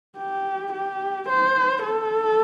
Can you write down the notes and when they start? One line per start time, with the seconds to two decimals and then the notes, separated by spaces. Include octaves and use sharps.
0.18 G4
0.73 G4
1.29 C5
1.84 A4